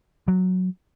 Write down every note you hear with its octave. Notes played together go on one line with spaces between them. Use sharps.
F#3